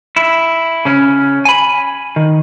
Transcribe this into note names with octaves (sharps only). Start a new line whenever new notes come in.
E4
C#3 C#4
G#5 B5
D#3